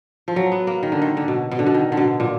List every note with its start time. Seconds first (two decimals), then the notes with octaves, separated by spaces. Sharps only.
0.28 F3
0.36 F#3
0.52 B3
0.67 A#3
0.83 D#3
0.92 D3
1.02 D#3
1.17 D3
1.28 B2
1.52 B2
1.59 D3
1.66 B2
1.74 D#3
1.92 D3
1.97 B2
2.20 A#2